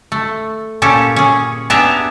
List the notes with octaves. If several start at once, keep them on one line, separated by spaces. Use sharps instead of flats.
A3
A#2 C#4 G4 A4
C#4 G#4
B3 D4 G4 G#4 E5 A#5